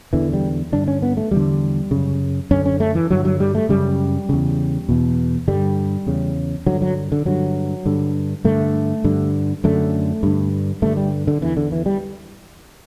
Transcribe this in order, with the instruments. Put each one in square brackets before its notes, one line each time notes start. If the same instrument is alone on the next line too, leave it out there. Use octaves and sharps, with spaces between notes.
[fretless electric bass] E2 D3 E3
G3
G2 D3 D4
C#4
B3
A3
E2 D3 G3
F#2 C#3
F#2 D3 C#4
C#4
A3
E3
G2 D3 F#3
F#3
G3
A3
F#2 C#3 G3
E2 C#3
E2 B2
G2 D3 G3
E2 C#3
G2 D3 F#3
F#3
D3
G2 D3 F#3
G2 D3
G2 D3 A3
G2 D3
F#2 D3 A3
G2 D3
G2 D3 A3
G3
D3
E2 D3 E3
D3
E3
G3